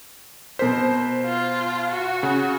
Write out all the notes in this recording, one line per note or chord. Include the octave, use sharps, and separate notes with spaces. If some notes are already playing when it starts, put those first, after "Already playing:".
B2 A#4 C5 B6
F4
F#4
C#3